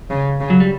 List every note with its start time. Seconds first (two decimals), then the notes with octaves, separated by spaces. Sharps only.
0.10 C#3
0.41 C#3
0.50 F#3
0.60 G3